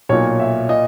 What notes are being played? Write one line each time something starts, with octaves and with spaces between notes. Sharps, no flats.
B1 A#2 C#5
E5
A#2 D#5